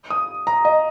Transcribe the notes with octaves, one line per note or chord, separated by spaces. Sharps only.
D#6
A#5
D#5